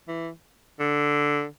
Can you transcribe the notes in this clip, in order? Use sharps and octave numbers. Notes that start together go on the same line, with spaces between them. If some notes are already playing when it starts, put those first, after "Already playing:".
E3
D3